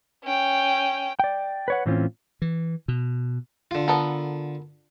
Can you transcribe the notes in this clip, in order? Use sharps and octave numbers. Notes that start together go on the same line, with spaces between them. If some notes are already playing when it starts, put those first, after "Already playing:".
C#4 G5
D5 G5
B4 C#5 F#5
A2 E3 C4 C#4 F4
E3
B2
D3 F4
B3 A4 A#4